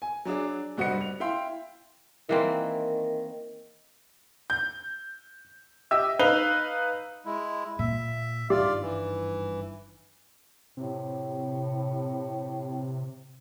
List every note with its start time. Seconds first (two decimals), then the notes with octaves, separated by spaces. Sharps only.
0.02 G#5
0.25 F#3 D4 G#4 D5
0.77 F1 G2 F#4 C5 D#5 C#7
1.01 F7
1.20 E4 F5 G5 C6
2.29 D#3 E3 A#3 C4
4.50 G6
5.91 G4 D#5 E5 E6
6.19 D#4 B4 F5 F7 G7
7.26 G#3 E4
7.79 A#2 E5
8.50 G#1 G2 F4 G4 D5
8.82 E3
10.77 A2 C3